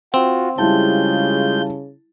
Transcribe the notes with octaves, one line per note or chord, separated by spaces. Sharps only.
C4 F4 F#4
C#3 G3 G#3 E4 F4 A5 G6